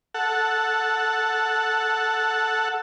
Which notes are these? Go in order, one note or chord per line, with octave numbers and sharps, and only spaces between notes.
A4 F#5